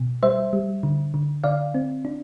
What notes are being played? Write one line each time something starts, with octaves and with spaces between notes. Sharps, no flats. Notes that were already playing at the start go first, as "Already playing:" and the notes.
Already playing: B2
G3 C5 E5
G3
D3
D3
D3 D5 F5
C4
D4